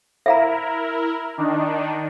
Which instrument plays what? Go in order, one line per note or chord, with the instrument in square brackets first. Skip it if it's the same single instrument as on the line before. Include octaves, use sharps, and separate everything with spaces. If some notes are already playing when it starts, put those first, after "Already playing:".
[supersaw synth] E4 A#4 [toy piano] E5 F5 A#5
[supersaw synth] D#3 D4 D#4